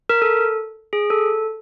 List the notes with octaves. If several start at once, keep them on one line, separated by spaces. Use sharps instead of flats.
A#4
A4
G#4
A4